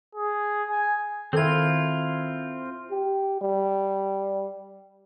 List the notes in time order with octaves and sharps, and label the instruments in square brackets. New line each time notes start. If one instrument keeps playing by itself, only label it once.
[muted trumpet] G#4
G#5
[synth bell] D#3 G#6 [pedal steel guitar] C4 F4 [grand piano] E4 A4
[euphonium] G4
G3